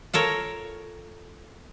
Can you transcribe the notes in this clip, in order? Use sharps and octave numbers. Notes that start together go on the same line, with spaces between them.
F4 A4 A#4 C#5